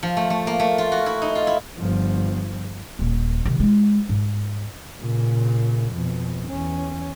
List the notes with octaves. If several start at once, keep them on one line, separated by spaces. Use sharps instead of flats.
F3
A3
A3
A#3
A3
F4
F#4
E4
D#4
F4
E4
G1 F3
D#1
C3 D#3
G#3 F4
G#2
A#2 C#3
F2 B2
E2 C#4